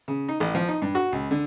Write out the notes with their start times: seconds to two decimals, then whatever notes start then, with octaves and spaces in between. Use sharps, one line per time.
0.08 C#3
0.28 D#4
0.40 A1
0.55 F3
0.68 D#4
0.82 G2
0.95 F#4
1.12 C#2
1.31 D3